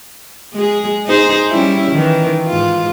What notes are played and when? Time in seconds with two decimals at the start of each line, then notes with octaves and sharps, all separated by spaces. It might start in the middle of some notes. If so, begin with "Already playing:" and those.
0.53 G#3 G#4
1.06 D#4 G#4 C5
1.51 G3 C#4 E4
1.91 D#3 E3
2.47 G#2 F4